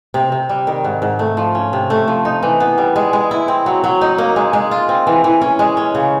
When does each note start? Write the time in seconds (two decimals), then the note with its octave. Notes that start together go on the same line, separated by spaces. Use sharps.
0.14 C3
0.32 C3
0.49 G3
0.67 D#3
0.84 G#2
1.02 G#2
1.19 A3
1.37 F3
1.55 C#4
1.73 C3
1.90 A3
2.08 F3
2.25 D#4
2.43 E3
2.60 B3
2.78 G3
2.96 G#3
3.13 G#3
3.31 E4
3.48 C4
3.66 F#3
3.84 F#3
4.01 D#4
4.18 A#3
4.36 G#3
4.53 G#3
4.71 F4
4.89 C4
5.07 E3
5.24 E3
5.42 C#4
5.59 G#3
5.77 C#4
5.95 C#3